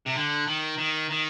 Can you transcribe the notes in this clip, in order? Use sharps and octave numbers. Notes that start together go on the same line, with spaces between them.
C3
D3
D#3
D#3
D#3